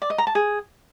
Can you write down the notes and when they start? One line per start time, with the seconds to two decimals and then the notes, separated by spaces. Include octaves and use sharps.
0.02 D5
0.10 D#5
0.18 A#5
0.27 A5
0.35 G#4